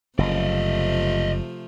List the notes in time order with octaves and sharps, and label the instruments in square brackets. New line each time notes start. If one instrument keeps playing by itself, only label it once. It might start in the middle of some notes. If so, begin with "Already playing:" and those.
[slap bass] F#1 [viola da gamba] C3 F3 A3 [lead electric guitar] D5 D#5